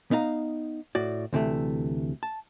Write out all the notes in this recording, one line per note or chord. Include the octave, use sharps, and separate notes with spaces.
B3 D#4 F5 A#5
A2 F#4 D5
D2 C3 E3 A3
A5